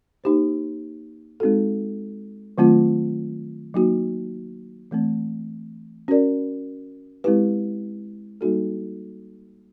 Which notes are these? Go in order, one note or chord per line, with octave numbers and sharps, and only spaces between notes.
A#3 D#4 G4 C5
G#3 C4 D#4 F#4 A4
D#3 F#3 A3 C4 F4
F#3 A#3 D#4 F#4
E3 A3 C4
C#4 F#4 A#4 D5
G#3 C4 E4 G4 B4
G3 A#3 D#4 F#4 A4